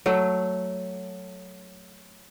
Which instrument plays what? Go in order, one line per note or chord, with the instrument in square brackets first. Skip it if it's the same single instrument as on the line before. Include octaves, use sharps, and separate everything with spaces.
[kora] F#3 A3 F#4